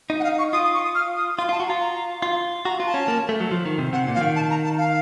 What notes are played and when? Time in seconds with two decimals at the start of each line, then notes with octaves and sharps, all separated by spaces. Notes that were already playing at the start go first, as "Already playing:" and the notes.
0.10 D#4
0.20 F#5
0.24 F5
0.39 C#6
0.53 F4 D#6
0.64 D#6
0.74 C#6
0.84 D#6
0.95 F6
1.16 D#6
1.38 F4 C6
1.49 F4 A5
1.60 F#4
1.67 A#5
1.70 F4
1.81 A#5
2.22 F4
2.65 F#4 A#5
2.80 F4
2.87 A5
2.94 C#4
3.08 A#3
3.29 A3
3.41 F#3
3.51 F3
3.66 D#3
3.79 C3
3.93 C3 F#5
4.08 A#2
4.15 F3 F5
4.21 D#3
4.36 A5
4.50 A#5
4.64 A5
4.78 F5